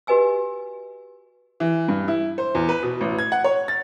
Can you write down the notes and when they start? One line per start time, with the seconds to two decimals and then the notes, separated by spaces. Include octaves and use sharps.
0.07 F#4 G4 B4 D#5 G#5 E6
1.60 E3
1.88 G2
2.08 E4
2.38 C5
2.55 E2
2.69 B4
2.83 B2
3.01 A1
3.19 G#6
3.32 F#5
3.44 C#5
3.68 A6